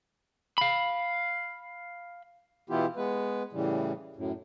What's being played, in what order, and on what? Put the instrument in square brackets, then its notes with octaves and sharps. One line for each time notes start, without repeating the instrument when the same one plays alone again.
[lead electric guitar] F5 B5
[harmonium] B2 E3 B3 E4 F4 G4
G#3 B3 B4
A2 C#3 E3 G3
F#2 A2